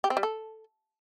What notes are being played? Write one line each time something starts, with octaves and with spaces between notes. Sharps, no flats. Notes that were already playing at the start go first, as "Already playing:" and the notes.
G4
C4
G3
A4